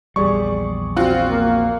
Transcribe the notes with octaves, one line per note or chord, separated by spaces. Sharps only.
A#1 E2 G3 G#4 D5 C#6
C4 F4 F#4
A#3